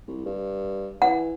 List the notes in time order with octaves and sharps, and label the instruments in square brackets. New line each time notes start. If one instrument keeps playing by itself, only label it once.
[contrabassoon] C2
G2
[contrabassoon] E3 [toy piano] F#5